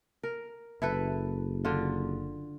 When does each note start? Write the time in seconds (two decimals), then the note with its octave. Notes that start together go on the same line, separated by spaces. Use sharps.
0.23 A#4
0.82 F#1 E4 A4 B4
1.65 D3 F4